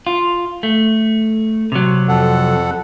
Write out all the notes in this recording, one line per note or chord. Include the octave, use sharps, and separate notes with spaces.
F4
A3
C3 F#3
F2 A4 F#5